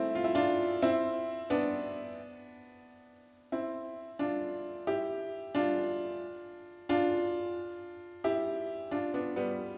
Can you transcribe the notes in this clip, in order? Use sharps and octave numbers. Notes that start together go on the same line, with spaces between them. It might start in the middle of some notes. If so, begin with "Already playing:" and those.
Already playing: A3 C4 E4
F4
E4
D4 F4
C4 E4
B3 D4
C4 E4
D4 F4
E4 G4
D4 F4
D4 F4
E4 G4
D4 F4
B3 D4
G3 B3